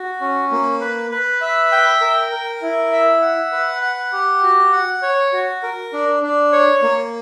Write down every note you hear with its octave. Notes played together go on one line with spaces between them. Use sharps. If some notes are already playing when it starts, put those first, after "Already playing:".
Already playing: F#4
C#4
A#3
B4
B4
E5
G5
A#4
A#4
E4
E5
F#5
B4
F#5
G4
F#4
F#5
C#5
F#4
A#4
D4
D4
C#5
A#3